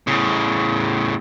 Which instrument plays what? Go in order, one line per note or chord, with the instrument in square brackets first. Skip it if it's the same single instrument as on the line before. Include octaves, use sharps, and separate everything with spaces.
[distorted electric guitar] A2 C#3